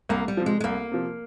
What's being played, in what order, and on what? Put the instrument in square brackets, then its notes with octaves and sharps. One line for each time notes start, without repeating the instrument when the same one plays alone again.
[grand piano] C2 [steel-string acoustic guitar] A#3
[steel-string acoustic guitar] G3
[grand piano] C3 F3
[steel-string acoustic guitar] G#3
G#3
[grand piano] C2 [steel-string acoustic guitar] A#3
[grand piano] C3 F3